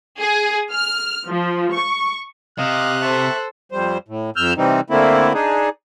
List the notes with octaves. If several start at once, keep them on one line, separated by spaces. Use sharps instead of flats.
G#4
F6
F3
C#6
C3 D#5 F5 F#6
A4 C5 E5 A5 C#6
F2 G3 C5
A2
F2 E6 F6 G6
C3 E3 G3 C4 D#4
D3 A3 A#3 C4 E4
D4 D#4 G#4